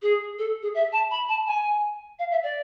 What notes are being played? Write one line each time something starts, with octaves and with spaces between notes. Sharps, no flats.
G#4
A4
G#4
E5
A5
B5
A5
G#5
F5
E5
D5